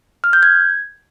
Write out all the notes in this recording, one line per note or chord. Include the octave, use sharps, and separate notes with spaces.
F6
G6
G#6